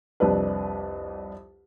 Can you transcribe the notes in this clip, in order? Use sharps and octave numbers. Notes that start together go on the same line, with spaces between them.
C2 F2 D4 B4